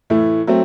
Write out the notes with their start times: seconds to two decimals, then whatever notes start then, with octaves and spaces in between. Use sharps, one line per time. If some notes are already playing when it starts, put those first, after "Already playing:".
0.10 A2 E3 A3
0.47 F#3 A3 C4